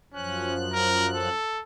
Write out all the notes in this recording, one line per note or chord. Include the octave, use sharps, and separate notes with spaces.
F#2 F3 C#4 F#6
A#4
A4